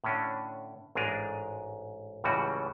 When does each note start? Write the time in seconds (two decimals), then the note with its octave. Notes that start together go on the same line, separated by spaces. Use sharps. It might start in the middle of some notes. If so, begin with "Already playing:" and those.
0.04 A2 D3 C#4 D4
0.95 A1 G#2 D4 G#4 A#4
2.24 C#2 A2 C#3 E3 G3 F#4